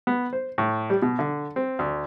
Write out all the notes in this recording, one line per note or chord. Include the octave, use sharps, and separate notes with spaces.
B3
C5
A2
G3
B2
D3
C4
D2